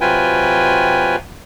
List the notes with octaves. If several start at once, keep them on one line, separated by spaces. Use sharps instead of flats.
C3 F#3 F4 B4 G5 G#5